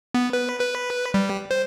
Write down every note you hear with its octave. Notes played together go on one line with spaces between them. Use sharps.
B3
B4
B4
G3
C5